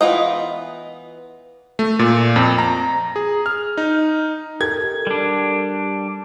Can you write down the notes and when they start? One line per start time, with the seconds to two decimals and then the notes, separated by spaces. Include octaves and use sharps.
0.01 E3 B3 F4 D#5
1.79 A3
1.99 A#2
2.36 F2
2.58 A#5
3.16 G#4
3.46 F6
3.77 D#4
4.61 G4 A4 A#4 G#6
5.07 G3 D4